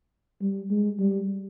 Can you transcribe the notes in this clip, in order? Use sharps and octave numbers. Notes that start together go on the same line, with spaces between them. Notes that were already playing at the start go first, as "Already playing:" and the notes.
G3
G#3
G3